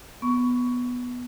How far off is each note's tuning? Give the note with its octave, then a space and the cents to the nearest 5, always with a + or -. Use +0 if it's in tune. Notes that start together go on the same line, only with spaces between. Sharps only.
B3 +0 C#6 +15